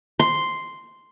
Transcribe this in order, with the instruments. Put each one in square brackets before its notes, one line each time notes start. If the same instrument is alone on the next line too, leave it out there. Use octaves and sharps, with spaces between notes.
[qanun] C6